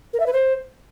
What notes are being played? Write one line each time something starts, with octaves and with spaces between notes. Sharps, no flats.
A#4
E5
B4
C5